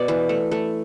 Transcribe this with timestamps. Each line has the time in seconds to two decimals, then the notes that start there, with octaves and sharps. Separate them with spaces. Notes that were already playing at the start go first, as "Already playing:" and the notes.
Already playing: B2 D5
0.08 E3
0.29 A3
0.51 A3